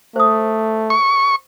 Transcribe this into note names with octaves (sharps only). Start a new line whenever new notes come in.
A3 C5 D#6
C#6